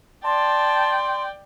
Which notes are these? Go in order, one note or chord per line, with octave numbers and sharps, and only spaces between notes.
D5 G5 A5 C6